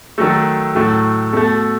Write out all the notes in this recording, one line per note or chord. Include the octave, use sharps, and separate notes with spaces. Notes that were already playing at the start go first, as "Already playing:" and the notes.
D#3 F#3 A3 A4
A2 F#3 A3
B2 A3 A4